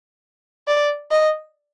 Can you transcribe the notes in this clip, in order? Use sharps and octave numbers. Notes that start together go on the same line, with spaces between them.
D5
D#5